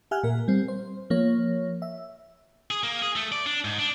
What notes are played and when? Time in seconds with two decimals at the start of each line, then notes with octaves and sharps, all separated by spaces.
0.11 G4 E5 F#5 G#5 F6 F#6
0.23 A#2 A#4
0.48 G3 C4
0.68 C5
1.10 F3 A#3 C#5
1.82 E5
2.71 G#4
2.83 A#3
3.02 G#4
3.16 A3
3.32 D5
3.46 D4
3.65 G#2
3.79 D4